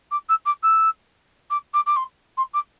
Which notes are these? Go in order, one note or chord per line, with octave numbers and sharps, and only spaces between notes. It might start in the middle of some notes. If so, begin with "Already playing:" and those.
D6
E6
D6
E6
D6
D6
D6
C6
C6
D6